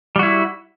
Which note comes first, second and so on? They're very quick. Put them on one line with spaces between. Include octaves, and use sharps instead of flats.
G3 F#4 E4